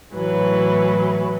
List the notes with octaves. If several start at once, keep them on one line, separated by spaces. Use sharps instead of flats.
A2 E3 F#3 B4